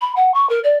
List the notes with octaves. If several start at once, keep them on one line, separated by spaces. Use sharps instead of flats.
B5
F#5
C#6
A#4
D5